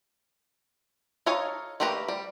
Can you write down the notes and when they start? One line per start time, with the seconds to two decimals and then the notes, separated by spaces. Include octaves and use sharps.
1.26 D#4 A4 C#5 F5 G#5
1.80 A3 A#3 G4 B4 A#5
2.08 G3